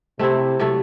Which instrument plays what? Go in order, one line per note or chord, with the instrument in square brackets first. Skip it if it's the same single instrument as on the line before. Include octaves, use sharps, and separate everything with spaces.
[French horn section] C3 [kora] A3 C4 E4
[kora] C3 F#3 A3